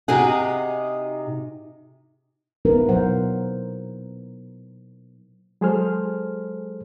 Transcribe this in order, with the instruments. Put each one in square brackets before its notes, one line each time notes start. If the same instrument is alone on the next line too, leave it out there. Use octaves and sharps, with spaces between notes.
[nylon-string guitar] C3 D#4 F#4 G#4 F#5
[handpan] A#3 B3 D#4 E4 A#4 B4
B2 F#3 C5 F#5
[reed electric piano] F#3 G#3 G#4 A4 C5 F6